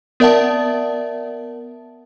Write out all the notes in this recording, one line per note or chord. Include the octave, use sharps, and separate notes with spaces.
B3 A#4 D5 E5 F#5 A5